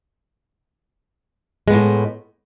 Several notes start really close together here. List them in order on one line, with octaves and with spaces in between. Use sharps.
G#3 B3 A2